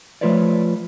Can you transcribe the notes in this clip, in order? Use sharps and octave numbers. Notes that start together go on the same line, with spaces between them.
F3 A3 F4 B4 C#5 D5